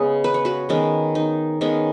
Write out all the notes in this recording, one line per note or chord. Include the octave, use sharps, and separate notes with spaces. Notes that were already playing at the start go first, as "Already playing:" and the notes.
Already playing: C#3 G#3 B3 G#4 C#5
B4
C#5
F#4 B4
D#3 G#3 B3 C#4
D#4
D#3 G#3 B3 C#4